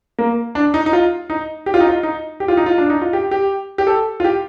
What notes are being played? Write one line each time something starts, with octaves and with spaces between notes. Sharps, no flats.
A#3
D4
D#4
D#4
F4
D#4
G4
F4
D#4
F4
D#4
G4
F4
D#4
F4
D4
D#4
F4
G4
G4
G4
A4
F4
G4